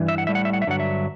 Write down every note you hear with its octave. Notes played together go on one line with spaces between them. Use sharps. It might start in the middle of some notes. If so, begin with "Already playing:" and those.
Already playing: G2 E3
E5
F#5
A2 G3 E5
F#5
E5
F#5
E5
G2 D3 F#3 F#5
E5